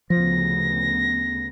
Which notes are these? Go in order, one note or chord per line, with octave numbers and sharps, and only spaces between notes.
D2 C#3 F3 B3 A#6